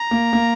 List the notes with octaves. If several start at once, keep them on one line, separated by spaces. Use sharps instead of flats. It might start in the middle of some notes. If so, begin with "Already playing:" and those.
Already playing: A#5
A#3
A#3